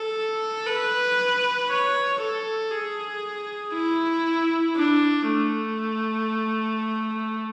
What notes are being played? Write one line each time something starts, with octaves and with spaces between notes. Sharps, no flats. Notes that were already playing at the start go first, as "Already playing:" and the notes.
Already playing: A4
B4
C#5
A4
G#4
E4
D4
A3